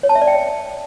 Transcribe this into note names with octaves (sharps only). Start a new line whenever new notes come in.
C#5
A5
E5
D5
G5